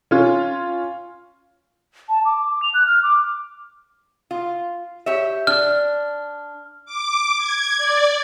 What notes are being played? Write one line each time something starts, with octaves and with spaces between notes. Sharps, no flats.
C#4 F4
A5
D6
D6
F7
F#6
F6
D6
F4
G4 C#5 E5
D4 F6
D6
G#6
D5